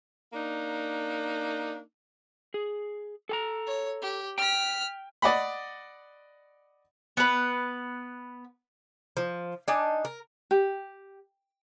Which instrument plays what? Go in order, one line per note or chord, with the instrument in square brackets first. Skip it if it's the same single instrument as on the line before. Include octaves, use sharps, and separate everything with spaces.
[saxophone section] A#3 D4 D#4
[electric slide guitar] G#4
A4 G#5 A#5
[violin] C#5
G4
[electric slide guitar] G5 [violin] F6 B6
[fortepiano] D5 D#5 F#5 B5
[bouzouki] B3 B4
F3
D4 D#4 G#5
A#4
[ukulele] G4